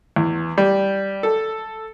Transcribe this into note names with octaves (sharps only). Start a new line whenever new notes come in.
E2
G3
A4